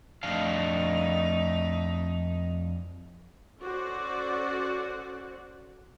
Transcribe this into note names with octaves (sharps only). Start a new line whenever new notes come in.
F2 A3 D4 D#4 F5
C#4 F#4 A4 C5 D5 F#5